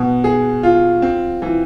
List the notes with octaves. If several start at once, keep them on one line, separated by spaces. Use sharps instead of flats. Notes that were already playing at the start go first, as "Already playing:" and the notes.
Already playing: B2 B3
G#4
F4
C4
E3